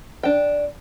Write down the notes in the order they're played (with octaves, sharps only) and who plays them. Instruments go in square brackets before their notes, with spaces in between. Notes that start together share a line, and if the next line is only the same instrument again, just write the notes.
[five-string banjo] D4 G5